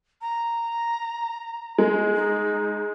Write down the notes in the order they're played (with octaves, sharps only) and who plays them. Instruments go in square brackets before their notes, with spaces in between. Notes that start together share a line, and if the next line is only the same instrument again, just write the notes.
[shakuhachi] A#5
[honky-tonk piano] G#3
[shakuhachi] D#4